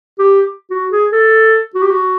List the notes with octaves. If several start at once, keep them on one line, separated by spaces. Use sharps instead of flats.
G4
F#4
G#4
A4
F#4
G4
F#4